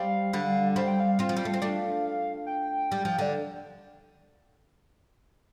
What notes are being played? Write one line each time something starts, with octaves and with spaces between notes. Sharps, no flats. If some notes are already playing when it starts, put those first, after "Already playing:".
Already playing: G3 C4 F5
D3 G3
G3 C4 F5
G5
F5
C4 F4
F3
G3
A3
C4
A3 D4
G5
G3
F3
D3 D5